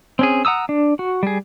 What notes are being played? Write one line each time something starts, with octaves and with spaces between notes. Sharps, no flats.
C4 C#4 G#4
F#5 A#5 D#6 E6
D4
F#4
G3 G#4